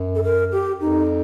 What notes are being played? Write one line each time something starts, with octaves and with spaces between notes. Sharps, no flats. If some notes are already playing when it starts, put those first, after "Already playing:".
Already playing: F#2
A4
A#4
G4
F2 D#4